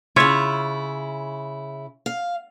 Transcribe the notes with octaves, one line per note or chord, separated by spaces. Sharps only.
C#3 E4 F4 C#5 E5
F5